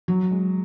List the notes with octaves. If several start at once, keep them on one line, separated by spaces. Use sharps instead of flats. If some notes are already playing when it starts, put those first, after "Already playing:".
F#3
G#3